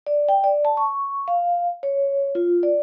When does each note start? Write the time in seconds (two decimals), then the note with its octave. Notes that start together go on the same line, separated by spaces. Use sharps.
0.07 D5
0.29 G5
0.44 D5
0.65 A5
0.77 C#6
1.28 F5
1.83 C#5
2.35 F4
2.63 D5